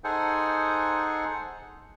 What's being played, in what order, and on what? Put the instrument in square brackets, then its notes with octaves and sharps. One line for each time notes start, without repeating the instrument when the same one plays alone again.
[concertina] D#4 G#4 A4 C5 F#5 G#5